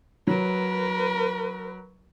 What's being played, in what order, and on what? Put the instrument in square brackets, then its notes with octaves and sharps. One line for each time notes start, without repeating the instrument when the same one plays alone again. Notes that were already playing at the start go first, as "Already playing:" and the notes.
[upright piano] F#3 [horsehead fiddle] A#4 B4